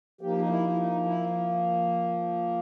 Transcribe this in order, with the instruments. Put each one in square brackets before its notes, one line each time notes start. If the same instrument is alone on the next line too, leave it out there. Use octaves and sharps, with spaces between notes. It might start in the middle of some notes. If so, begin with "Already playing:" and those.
[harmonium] F3 A#3 D#4 G4
D#4
E4
E4
D#4
E4